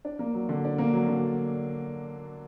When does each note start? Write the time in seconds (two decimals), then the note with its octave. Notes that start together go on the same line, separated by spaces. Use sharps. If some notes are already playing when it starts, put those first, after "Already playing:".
0.05 D4
0.19 A#3
0.35 F#3
0.49 D3
0.65 D4
0.78 A#3
0.93 F#3
1.08 D3